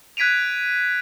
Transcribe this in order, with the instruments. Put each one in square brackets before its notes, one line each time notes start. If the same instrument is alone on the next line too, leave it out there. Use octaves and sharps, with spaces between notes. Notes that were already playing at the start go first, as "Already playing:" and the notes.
[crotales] F#6 G#6 B6 D7 D#7 F7